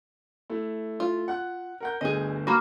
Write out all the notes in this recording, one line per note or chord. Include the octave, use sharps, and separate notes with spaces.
A3 E4
F4
F#5 F#6
A#4 F#5 G6
G1 D2 G#4 D#5
A#3 F#4 B5 D6 F6